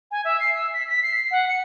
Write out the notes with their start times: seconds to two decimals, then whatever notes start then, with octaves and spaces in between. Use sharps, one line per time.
0.11 G#5
0.25 E5
0.40 C7
0.55 E6
0.74 B6
0.88 B6
1.03 C7
1.31 F#5
1.48 C#7